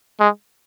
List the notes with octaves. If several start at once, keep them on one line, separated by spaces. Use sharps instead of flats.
G#3